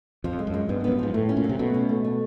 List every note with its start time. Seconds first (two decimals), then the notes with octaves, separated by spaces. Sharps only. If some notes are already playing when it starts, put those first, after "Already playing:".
0.24 F2 F3
0.39 G#3
0.47 F#2
0.54 G#3
0.69 G2 B3
0.80 G#2
0.84 F#2 B3
0.92 G2
0.99 G#2 F3
1.14 A2 A3
1.29 C#4
1.37 A#2
1.44 F#3
1.49 C3
1.59 B2 A3
1.74 C#4
1.89 A3
2.04 A3